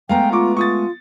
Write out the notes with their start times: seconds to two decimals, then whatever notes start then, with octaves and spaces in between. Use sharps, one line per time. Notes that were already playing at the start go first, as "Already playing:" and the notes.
0.09 G#3 A3 B3 F5 G5 A#5
0.32 F4 A#5 C#6 D6
0.57 F4 C#6 D#6 A6